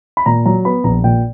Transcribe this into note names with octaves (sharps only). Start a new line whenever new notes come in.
B5
A#2 A#5
F#3 A#5
B3 B5
A#1 A#5
A#2 G5